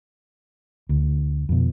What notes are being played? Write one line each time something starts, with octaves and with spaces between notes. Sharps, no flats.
D2
F2 B2